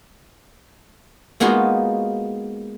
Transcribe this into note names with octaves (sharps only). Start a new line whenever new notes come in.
G#3 A#3 B3 D#4 F4 F#4